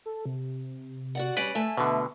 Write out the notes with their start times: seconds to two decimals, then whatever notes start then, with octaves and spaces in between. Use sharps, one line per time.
0.06 A4
0.25 C3
1.15 F#4 D5 F#5
1.37 G3 C#4 B4 D5
1.55 A3 E5 G#5
1.78 B2 D3 B4